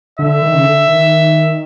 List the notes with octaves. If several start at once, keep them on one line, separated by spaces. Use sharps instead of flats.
D3 E5
D#3
C#3
D3
D#3